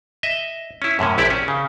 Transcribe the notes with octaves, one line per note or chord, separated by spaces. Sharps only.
D#5 E5
C#4 E4
F#2 A2 C3 C#4
A#1 E4 G4 D5
C#4
C#3